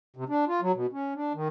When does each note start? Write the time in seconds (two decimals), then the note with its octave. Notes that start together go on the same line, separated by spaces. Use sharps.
0.16 C3
0.29 D4
0.48 F4
0.62 F#3
0.74 B2
0.93 C#4
1.15 D4
1.34 D#3